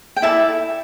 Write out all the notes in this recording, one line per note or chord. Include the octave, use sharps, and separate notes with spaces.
G5
E4 A4 D5 E5 A5